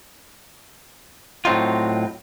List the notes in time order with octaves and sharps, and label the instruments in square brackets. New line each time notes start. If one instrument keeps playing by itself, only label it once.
[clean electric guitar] A2 F#3 C4 D#4 F4